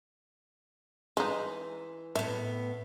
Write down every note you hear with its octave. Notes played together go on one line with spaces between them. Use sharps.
E3 G#3 D#4
A2 B3 E5